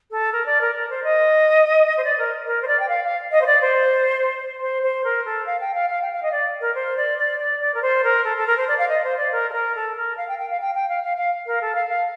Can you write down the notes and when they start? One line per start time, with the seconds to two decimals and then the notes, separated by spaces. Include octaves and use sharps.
0.11 A4
0.32 A#4
0.45 D5
0.61 A#4
0.75 A#4
0.90 C5
1.03 D#5
1.97 C5
2.04 D5
2.18 A#4
2.46 A#4
2.62 C5
2.67 D5
2.79 G5
2.88 F5
3.04 F5
3.31 D#5
3.41 C5
3.46 D5
3.61 C5
4.61 C5
4.82 C5
5.04 A#4
5.25 A4
5.46 F5
5.60 G5
5.74 F5
5.90 F5
6.01 G5
6.12 F5
6.22 D#5
6.31 D5
6.61 A#4
6.75 C5
6.97 D5
7.18 D5
7.39 D5
7.60 D5
7.74 A#4
7.82 C5
8.04 A#4
8.24 A4
8.37 A4
8.47 A#4
8.57 C5
8.67 D5
8.78 F5
8.88 D#5
9.04 C5
9.17 D5
9.32 A#4
9.49 A4
9.53 A#4
9.75 A4
9.96 A#4
10.17 F5
10.28 G5
10.38 G5
10.50 F5
10.60 G5
10.74 G5
10.88 F5
11.03 F5
11.17 F5
11.46 A#4
11.61 A4
11.75 F5
11.89 F5